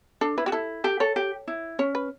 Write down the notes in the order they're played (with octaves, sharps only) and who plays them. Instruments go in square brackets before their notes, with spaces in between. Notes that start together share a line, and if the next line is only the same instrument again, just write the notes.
[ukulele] D4 [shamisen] A4
[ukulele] E4 [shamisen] B4
[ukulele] F#4 [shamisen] G4
[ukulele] E4 [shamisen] A4
[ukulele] G4 [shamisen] A4
[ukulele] A4 [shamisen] C#5
[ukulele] G4
E4
[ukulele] C#4 [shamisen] C#5
[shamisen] B4